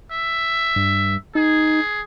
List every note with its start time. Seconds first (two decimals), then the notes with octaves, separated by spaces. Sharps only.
0.12 E5
0.76 G2
1.35 D#4 G#4